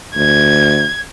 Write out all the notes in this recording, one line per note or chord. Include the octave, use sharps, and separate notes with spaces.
D2 G#6